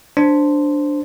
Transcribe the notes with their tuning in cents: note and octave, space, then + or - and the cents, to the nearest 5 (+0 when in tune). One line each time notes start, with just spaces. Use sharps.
D4 +0 C5 +0